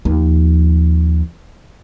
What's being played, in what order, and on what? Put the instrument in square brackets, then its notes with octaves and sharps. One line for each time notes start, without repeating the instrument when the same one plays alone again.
[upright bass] D#2 F3